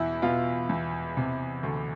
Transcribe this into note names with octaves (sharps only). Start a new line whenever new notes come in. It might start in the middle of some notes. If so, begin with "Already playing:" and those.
Already playing: E2 B2 E4
B2 F4
E2
C3
D2